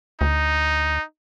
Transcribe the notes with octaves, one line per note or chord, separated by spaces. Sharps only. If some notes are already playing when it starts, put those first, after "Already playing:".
D2 D#4